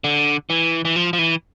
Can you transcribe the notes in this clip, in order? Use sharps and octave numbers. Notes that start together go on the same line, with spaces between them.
D3
E3
E3
F3
F3
E3